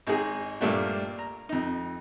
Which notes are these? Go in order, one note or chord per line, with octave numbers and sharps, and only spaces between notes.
G#1 G#3 D#4 G#4
G2 A#2 A3 A#3 D4 G4
A#5
F2 D#4